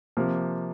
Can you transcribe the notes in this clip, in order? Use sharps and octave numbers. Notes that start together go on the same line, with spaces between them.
C3 F3 A#3